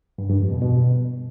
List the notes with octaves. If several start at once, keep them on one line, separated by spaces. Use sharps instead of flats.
G2
G2
F2
B2
B2